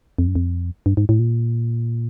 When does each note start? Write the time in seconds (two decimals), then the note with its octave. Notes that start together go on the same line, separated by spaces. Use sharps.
0.19 F2
0.27 F#2
0.35 F2
0.86 G2
0.97 G#2
1.09 A2
1.19 A#2